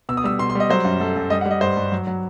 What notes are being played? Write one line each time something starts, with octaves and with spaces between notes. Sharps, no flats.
B2 E6
D#6
G3 E6
B2 C6
C6
G3 D#5
F#3 C5
F#2
F#3 A4
F#2
G3 D#5
F#5
G3
D#5
G2 C5
G2
F#3
F#3